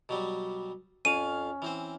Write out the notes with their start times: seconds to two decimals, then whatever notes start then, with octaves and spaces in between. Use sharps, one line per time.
0.09 B2 F#3 G3
1.05 F2 C#4 F5 D#7
1.62 E3 C4 C5